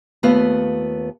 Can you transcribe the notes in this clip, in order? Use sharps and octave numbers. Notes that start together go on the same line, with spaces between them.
D#2 A3 B3 F4 B4 F5